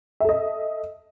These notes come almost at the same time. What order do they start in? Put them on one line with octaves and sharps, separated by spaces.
E5 A4 D#5